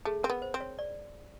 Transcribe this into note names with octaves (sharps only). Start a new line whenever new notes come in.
A3 G#4
C4 A#4
B3
C5
C4
C#5
D5